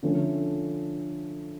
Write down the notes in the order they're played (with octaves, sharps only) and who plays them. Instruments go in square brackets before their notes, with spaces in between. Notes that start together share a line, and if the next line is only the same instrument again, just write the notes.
[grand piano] D3 F3 A3 C#4